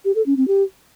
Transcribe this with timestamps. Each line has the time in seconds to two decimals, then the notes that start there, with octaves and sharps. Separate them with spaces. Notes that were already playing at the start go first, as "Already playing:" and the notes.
0.05 G4
0.16 A4
0.26 C#4
0.37 C4
0.48 G4